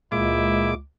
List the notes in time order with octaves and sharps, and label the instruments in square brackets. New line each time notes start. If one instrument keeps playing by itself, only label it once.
[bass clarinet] C#2 [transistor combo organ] A#2 G#3 D6 [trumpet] E4